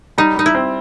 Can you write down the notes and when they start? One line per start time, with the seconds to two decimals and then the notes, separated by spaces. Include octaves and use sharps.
0.18 G3 D#4
0.36 G3 D#4
0.46 E4
0.55 C4